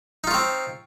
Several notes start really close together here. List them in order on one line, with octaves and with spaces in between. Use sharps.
D#4 F4 C#5 C4